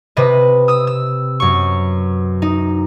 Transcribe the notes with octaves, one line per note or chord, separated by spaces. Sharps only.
C3 B4 D#5
D#6 E6
E6
F#2 C#6
D#4